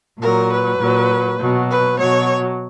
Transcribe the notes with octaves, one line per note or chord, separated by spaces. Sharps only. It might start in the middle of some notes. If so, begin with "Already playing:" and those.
A#2 F#3 A#4
B4
A#2 F#3
B2 F#3
B4
B2 F#3 C#5